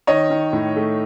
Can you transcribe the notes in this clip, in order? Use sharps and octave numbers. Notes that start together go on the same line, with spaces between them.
D#3 C#5 D#5
D#3
A2
A3